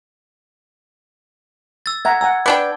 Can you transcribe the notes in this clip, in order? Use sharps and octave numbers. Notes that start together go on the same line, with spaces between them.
E6 A6
E5 F#5 A#5 G#6
F#5 G#5 A#5 E6
B3 D4 G5 B5 D6